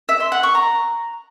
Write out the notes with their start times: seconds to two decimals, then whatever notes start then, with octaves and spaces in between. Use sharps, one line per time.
0.09 E5
0.20 C6
0.32 F#5
0.43 C#6
0.55 A#5